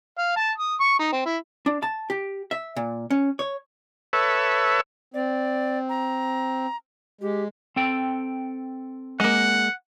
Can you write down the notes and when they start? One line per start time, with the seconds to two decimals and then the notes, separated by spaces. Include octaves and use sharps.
0.19 F5
0.37 A5
0.58 D#6
0.80 C#6
0.99 D#4
1.12 C4
1.25 E4
1.66 D4
1.83 A5
2.10 G4
2.51 E5
2.76 A#2
3.10 C#4
3.39 C#5
4.13 A4 B4 C#5 E5
5.14 C4 D5
5.89 A#5
7.21 G#3 G4
7.76 C4 A4 G5
9.20 G#3 A#3 F#5